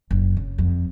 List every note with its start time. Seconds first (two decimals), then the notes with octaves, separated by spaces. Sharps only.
0.11 F#1
0.37 C#3
0.58 F2